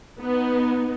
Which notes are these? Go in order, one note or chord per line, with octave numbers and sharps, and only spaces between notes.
B3 D#4